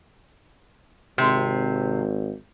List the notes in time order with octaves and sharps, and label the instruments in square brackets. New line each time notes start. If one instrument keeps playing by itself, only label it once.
[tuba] G#1 [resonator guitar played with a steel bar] C3